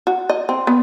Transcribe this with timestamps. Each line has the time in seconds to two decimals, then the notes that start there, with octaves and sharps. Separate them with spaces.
0.07 F#4
0.30 D#5
0.49 C4
0.67 B3